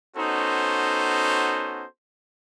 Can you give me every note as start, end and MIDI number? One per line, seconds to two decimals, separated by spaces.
0.17 1.86 59
0.17 1.86 61
0.17 1.86 63
0.17 1.86 66
0.17 1.86 69
0.17 1.86 72